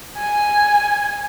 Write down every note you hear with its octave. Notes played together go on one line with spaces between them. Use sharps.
G#5